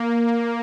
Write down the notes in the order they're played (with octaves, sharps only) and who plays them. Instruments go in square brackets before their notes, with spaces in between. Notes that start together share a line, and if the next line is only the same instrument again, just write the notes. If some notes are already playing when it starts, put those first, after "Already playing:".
Already playing: [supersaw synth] A#3